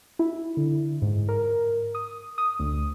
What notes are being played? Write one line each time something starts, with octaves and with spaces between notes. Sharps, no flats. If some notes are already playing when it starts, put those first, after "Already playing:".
E4
D3
G#2
A#4
D#6
D#6
D2